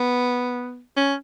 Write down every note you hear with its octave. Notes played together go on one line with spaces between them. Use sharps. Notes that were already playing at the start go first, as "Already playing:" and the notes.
Already playing: B3
C#4